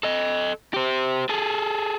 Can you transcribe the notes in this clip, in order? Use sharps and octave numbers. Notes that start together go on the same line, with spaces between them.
A4 D#5
G4 C5
G#4 A4